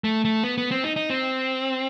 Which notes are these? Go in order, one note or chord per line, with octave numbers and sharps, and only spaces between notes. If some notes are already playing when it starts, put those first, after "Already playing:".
A3
A3
B3
B3
C4
D#4
D#4
C4